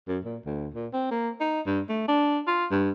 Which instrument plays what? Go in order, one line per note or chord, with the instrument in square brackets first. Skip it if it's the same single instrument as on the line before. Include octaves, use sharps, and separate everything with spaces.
[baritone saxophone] F#2
A#2
D2
A#2
C4
A#3
D#4
G2
A3
D4
F4
G2